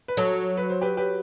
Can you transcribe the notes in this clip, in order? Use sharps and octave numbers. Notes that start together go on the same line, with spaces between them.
B4
F#3 A4
B4
C5
G4 B4
G4 B4